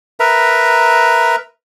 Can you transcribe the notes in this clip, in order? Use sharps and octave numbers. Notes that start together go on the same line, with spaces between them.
A#4 B4 E5 A#5